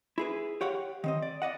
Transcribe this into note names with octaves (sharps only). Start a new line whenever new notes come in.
E4 G#4 B4
G4 C#5 F5 F#5
D#3 C4 D#5
D5
D5 D#5 F#5